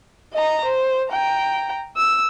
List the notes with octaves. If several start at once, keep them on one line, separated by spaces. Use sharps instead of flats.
D#5 A#5
C5
G5 A#5
E6